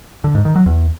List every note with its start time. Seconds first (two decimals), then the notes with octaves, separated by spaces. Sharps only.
0.24 D3
0.35 G#2
0.45 D#3
0.56 F#3
0.66 E2